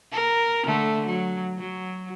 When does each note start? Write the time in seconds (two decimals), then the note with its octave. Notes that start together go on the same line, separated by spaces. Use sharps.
0.12 A#4
0.64 D3 A3
1.06 F#3
1.58 F#3